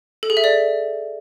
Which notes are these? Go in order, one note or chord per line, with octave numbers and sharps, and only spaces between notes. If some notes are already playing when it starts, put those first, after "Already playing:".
A4
G#4
E5
D5